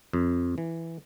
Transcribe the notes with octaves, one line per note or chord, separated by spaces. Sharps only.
F2
E3